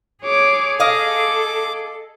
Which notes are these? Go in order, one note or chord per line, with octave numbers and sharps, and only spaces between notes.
G#4 C#5 D6
A4 D#5 F5 D6